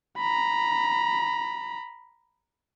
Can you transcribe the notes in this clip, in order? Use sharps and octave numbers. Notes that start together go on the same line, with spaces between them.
A#5 B5